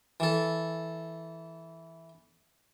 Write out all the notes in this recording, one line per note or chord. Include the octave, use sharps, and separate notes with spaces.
E3 A4